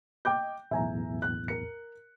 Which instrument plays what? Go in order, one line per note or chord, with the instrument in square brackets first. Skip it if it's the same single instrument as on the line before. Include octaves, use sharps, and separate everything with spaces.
[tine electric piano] D#5 [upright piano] G5 D6 G6
[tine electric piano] B1 E2 A2 [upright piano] E5 G#5 A#5
[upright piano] F#6
A#4 C#7